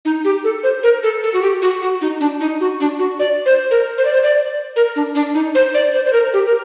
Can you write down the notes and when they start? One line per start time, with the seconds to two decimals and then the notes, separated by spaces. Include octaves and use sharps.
0.05 D#4
0.25 G4
0.44 A4
0.63 C5
0.83 A#4
1.03 A4
1.23 A4
1.34 F#4
1.42 G4
1.62 F#4
1.82 F#4
2.01 D#4
2.20 D4
2.41 D#4
2.61 F#4
2.80 D4
2.99 F#4
3.20 D5
3.46 C5
3.71 A#4
3.98 C5
4.05 D5
4.13 C5
4.23 D5
4.76 A#4
4.96 D4
5.15 D4
5.34 D#4
5.55 C5
5.74 D5
5.94 C5
6.06 C5
6.13 A#4
6.34 G4
6.46 A#4